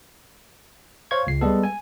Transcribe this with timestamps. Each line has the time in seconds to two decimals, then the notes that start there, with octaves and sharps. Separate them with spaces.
1.11 C5 C#5 F5 C#6 G#6
1.27 C#2 C7
1.41 G3 G#3 B3 A4
1.64 G#5